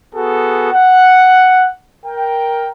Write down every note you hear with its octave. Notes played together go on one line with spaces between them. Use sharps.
B3 F#4 G#4 A4
F#5
A#4 G5